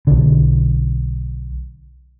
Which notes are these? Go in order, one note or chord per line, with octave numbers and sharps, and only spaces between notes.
B1 D3